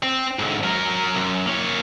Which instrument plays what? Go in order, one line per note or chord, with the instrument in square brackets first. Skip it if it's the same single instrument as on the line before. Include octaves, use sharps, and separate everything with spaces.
[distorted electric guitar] C4
G#2 D3
F#3 A#4
B1 F#2
A#3 C#5